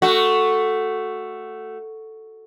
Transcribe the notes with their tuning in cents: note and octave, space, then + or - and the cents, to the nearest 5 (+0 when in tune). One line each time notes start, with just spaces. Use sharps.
A3 +5 F#4 +0